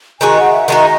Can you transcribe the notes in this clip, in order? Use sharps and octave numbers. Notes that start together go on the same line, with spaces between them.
D#3 G#3 D#4 F#4 G#5
F#5
E5
D#3 G#3 D#4 F#4 D#5